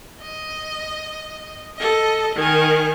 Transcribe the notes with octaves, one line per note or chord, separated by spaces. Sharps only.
D#5
A4 D#5
D#3 G#5